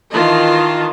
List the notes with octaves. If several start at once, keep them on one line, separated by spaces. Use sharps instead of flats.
D#3 E3 F4 D#5 A5